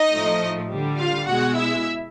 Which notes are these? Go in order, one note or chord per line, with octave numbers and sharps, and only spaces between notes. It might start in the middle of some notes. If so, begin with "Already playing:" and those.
Already playing: D#4 D#5
A2 F3 A3
D3 G3
F4 F5
B2 G#3 F#4 F#5
E4 E5